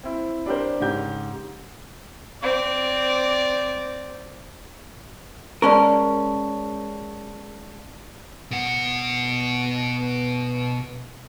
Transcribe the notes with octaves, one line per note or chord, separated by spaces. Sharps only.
C4 E4
D4 G4 A#4 C5
G#2 C#3 G4 G6
C4 D5
G#3 C#4 A#4 D5 A5 C#6
B2 F#5